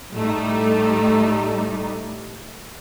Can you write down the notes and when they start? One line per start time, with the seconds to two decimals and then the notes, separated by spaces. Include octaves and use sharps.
0.12 A2 G3 A3 D#4